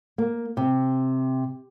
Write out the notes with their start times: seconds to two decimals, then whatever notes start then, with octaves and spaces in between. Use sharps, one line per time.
0.18 A#3
0.57 C3